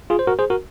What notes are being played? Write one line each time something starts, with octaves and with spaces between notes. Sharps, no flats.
F4 G#4
C5
F#4 A#4
G#4 C5
F#4 A#4